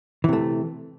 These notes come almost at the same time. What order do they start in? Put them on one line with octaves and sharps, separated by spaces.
E3 C3 A3